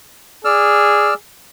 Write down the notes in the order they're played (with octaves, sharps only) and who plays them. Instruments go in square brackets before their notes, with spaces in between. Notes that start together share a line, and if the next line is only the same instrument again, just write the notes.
[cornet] G#4 [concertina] D5 E6 F6